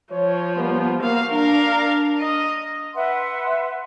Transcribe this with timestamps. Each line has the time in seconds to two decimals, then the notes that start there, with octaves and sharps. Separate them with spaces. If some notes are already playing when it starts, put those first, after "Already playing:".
0.12 F3 C#5
0.56 G3 A#3 B3
1.03 A#3 F#4 F5
1.32 D4 A#4 F5
2.21 D#5
2.94 B4 E5 F#5 C6